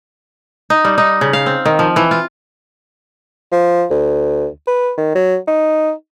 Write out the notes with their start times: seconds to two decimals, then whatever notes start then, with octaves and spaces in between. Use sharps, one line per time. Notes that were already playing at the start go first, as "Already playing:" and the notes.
0.70 D#4
0.85 G3
0.98 D#4
1.21 C#3
1.33 F5
1.46 C4
1.65 D#3
1.79 F3
1.96 E3
2.11 F4
3.52 F3
3.90 D2
4.67 B4
4.97 D#3
5.15 F#3
5.47 D#4